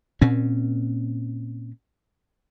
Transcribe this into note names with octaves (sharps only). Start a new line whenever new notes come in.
A#2 C4 C#4